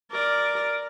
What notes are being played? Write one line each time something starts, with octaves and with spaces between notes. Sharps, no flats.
A#4 D5